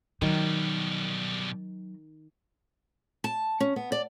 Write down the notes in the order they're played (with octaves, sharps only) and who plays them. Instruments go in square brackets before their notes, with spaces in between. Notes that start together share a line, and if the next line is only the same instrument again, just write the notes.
[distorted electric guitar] B2 G3 [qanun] D#3 [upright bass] F#3
[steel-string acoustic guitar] A5
C#4
B3
D5